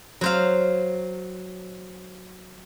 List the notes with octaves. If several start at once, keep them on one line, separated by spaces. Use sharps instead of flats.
F#3 C5 F5